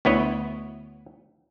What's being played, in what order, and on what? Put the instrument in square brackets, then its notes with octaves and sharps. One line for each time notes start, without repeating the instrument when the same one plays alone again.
[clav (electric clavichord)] D2 B3 E4 B4 C#5 D#5